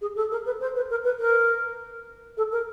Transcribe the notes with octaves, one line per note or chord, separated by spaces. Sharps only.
G#4
A4
A#4
B4
C5
B4
A#4
B4
A#4
A4
A#4